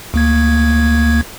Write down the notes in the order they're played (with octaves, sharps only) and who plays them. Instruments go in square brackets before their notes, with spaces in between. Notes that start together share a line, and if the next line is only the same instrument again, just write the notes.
[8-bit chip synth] D2 A#3 G#6